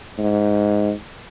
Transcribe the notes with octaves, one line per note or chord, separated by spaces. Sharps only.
G#2